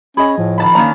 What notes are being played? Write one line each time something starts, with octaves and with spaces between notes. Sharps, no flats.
C#4 G#4 D#5 B5
A2 F3
D#3 A5 B5
D#3 A#3 C#4 D4 A#5